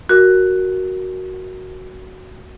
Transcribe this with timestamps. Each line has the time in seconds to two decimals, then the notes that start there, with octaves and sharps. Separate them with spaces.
0.09 F#4 A#4